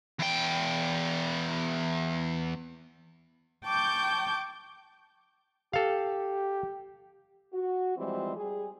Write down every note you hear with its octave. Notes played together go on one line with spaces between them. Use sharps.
E2 G5
G5 A5 C#6 D6 G6
G4 A4 F5
F#4
E3 F3 G3 G#3 C4
G3 G#4